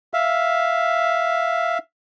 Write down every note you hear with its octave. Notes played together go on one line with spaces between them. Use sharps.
E5 F5